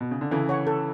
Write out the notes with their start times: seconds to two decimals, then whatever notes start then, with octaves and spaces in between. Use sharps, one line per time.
0.01 B2
0.11 C#3
0.21 D3
0.31 C#3 E3 A4
0.49 C#5 F#5 C#6
0.67 A4